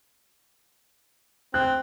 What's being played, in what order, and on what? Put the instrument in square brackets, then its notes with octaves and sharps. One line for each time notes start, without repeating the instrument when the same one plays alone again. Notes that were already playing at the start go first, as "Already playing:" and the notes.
[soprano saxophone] C4 [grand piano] F#6